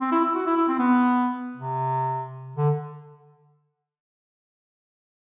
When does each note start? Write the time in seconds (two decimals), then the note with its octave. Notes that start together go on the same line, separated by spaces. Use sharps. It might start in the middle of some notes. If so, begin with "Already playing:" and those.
0.01 C4
0.12 E4
0.24 E4
0.35 F#4
0.46 E4
0.57 E4
0.68 C4
0.79 B3
1.57 C3
2.57 D3